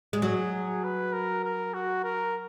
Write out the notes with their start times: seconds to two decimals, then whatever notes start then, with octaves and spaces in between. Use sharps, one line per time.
0.13 G#3
0.22 F#3 G#4
0.52 G#4
0.84 B4
1.13 A#4
1.44 A#4
1.74 F#4
2.04 A#4